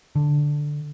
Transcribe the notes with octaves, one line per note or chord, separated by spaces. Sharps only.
D3